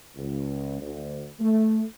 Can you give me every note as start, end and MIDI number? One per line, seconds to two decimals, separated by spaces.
0.16 0.79 37
0.80 1.27 38
1.39 1.83 57